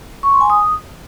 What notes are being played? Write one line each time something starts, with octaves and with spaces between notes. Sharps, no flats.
C#6
C6
G#5
D#6